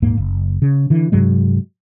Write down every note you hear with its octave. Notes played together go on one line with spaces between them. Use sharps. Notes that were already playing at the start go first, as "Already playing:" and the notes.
D#1 G#2 A#3
F#1
C#3
D3 E3
G2 C3 F#3 G#3